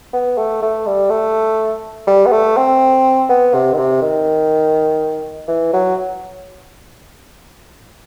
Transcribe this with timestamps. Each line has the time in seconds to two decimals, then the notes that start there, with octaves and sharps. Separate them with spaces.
0.13 B3
0.38 A3
0.62 A3
0.86 G3
1.10 A3
2.07 G3
2.26 B3
2.32 A3
2.57 C4
3.29 B3
3.54 C3
3.73 D#3
3.78 C3
4.02 D#3
5.48 E3
5.73 F#3